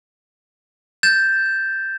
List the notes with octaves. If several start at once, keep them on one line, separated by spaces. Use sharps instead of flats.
G6 A6 E7